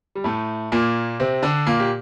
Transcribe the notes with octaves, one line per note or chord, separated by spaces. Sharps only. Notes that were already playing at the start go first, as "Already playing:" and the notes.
G3
A2 A3
A#2 A#3
C3 C4
D3 D4
A#2 A#3
G4